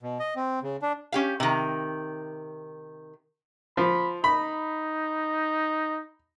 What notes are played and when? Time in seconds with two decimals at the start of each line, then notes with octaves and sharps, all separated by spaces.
0.03 B2
0.19 D#5
0.36 C4
0.63 C#3
0.82 D4
1.12 C#4 G4 F5
1.40 C3 D#3
3.77 F3 B5
4.24 D#4 B5